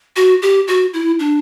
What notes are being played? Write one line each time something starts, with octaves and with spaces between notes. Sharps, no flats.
F#4
G4
F#4
E4
D4